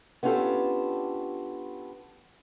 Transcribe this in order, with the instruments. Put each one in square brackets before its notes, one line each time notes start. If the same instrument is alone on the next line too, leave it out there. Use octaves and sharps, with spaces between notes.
[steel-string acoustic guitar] B3 C#4 D4 F4 G4 A4